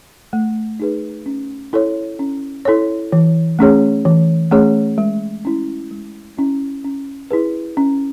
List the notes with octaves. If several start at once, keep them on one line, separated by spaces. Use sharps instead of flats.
A3
D#4 G#4 B4
C#4
E4 A4 C#5
C#4
E4 A4 C#5
E3
A3 C#4 G#4 C#5
E3
A3 C#4 G#4 C#5
G#3
C#4 E4
G#3
C#4 E4
C#4
E4 G#4 B4
C#4